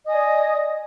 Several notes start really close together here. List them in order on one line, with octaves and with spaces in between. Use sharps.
D#5 D#6 G#5 D5